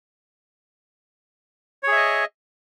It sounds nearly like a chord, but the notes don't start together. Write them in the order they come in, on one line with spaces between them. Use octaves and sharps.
C#5 G#4 E5 D#5